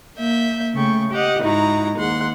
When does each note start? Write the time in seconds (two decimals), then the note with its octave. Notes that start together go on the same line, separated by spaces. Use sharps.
0.17 A#3 E5 G6
0.74 C#3 A3 G5 C#6
1.11 G4 D#5 F#5
1.41 G#2 D#4 E4 F#4 A#5
1.97 D#2 G#2 F#5 C6